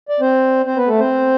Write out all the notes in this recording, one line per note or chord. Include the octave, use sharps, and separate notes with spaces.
D5
C4 C5
C4 C5
B3 B4
A3 A4
C4 C5